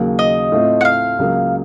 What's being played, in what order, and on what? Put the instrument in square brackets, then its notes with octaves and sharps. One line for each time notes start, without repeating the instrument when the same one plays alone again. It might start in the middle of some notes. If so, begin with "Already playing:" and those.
Already playing: [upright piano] D#2 C#3 F#3 A#3
[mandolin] D#5
[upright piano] A2 A3 C4 F4
[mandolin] F#5
F5
[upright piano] C#2 C#3 F#3 A#3